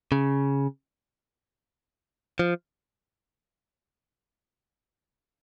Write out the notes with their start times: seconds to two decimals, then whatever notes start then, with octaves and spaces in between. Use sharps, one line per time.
0.12 C#3
2.39 F3